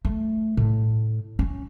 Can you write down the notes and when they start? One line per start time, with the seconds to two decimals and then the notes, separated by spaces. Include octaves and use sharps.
0.05 A3
0.57 A2
1.39 C#4